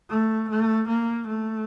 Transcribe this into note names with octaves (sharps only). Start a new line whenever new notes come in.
A3
A3
A#3
A3